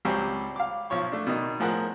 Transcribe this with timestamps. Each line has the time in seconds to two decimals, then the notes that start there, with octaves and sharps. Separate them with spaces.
0.05 C#2 F#3 G3 C4 G5 C#6
0.56 F5 D6
0.90 B1 F3 C#5 C#6
1.12 A3 D4
1.27 B2 D#3 D#4
1.60 A2 F3 G#4 A#4 F#5 F#6